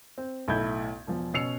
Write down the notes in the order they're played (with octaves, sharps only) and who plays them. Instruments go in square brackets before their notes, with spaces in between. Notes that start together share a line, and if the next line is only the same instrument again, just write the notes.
[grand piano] C4
B1 A2 E4 A4 G6 G#6
E1 F3
B2 C#4 E6 C7 C#7 F7